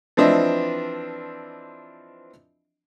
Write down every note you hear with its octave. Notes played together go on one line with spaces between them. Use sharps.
E3 F3 C4 D4 D#5 E5